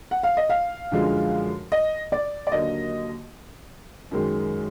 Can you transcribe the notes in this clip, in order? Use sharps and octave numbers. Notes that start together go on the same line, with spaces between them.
F#5
F5
D#5
F5
F#2 D3 F3 G#3
D#5
D5
D5
D#2 D3 F#3 A#3 D#5
F#2 D#3 G#3